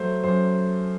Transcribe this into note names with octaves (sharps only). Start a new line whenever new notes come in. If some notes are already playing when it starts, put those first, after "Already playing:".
Already playing: F#3 A3 C5
F#2 C5